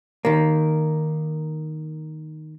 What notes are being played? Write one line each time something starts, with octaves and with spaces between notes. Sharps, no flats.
D#3 A#3